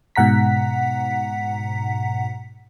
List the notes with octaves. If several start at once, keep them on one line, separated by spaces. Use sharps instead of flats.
G#2 B2 F#5 A#5 B6